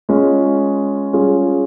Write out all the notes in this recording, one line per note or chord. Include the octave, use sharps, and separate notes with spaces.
G#3 C#4 F4
G3 C#4 F4 G#4